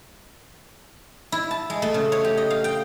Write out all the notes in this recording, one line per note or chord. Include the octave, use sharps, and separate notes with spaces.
E4
A5
G#3
A3
C#3
C#5
G4
D#5
F5
G5